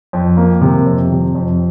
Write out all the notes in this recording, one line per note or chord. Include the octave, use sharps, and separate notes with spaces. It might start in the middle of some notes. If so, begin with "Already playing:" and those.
F2
A#3
C3
F2
C3
F2